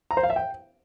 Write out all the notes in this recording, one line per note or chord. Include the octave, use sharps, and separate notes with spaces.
A#5
C5
F5
E5
G5